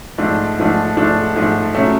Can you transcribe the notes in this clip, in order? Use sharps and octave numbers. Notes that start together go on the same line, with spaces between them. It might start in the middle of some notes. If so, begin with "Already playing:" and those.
G#2 F3 A3 D4
G#2 F3 A3 D4
G#2 F3 A3 D4
G#2 F3 A3 D4
C#3 F#3 A3